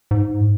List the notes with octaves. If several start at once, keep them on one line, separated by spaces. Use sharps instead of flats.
G#2